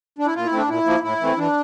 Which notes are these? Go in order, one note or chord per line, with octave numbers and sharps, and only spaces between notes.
D4
E4
A#2 F4
E4
A3 C4
D4
A#2 E4
F3 A#3
A2 E4
E3 A3 C4
E3 D4